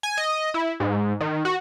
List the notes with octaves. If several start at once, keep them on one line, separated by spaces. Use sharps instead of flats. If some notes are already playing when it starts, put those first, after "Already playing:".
G#5
D#5
E4
G#2
D#3
F#4